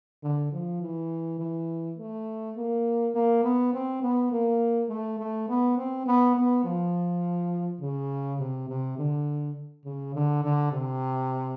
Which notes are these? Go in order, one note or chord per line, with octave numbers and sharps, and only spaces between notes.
D3
F3
E3
E3
A3
A#3
A#3
B3
C4
B3
A#3
A3
A3
B3
C4
B3
B3
F3
C#3
C3
C3
D3
C#3
D3
D3
C3